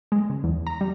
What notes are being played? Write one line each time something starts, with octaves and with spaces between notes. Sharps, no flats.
G#3
C#3
E2
A#5
G3